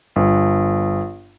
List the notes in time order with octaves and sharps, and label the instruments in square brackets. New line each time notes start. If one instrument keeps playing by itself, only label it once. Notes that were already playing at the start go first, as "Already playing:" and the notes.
[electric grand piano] G1